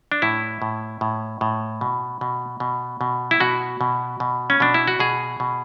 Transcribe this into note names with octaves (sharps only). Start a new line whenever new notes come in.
D4
A2 E4
A2
A2
A2
B2
B2
B2
B2
E4
B2 F#4
B2
B2
C#4
B2 D4
E4
F#4
B2 G#4
B2